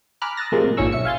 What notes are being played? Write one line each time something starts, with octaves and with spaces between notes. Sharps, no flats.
G#5 A#5 B5 D6 F6 F#6
D#6 E6 F#6 A6 A#6
A2 C3 F3 G#3 A#3
G#1 A#2 D#3 C#4 C#6 E6
B1 E5 E6 C#7
F5 G#5 C6 A6